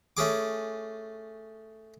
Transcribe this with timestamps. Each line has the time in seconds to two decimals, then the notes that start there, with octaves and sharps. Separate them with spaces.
0.17 A3 C#4 G#4 D6